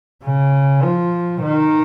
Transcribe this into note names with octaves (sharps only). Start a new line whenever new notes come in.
C#3
F3
D#3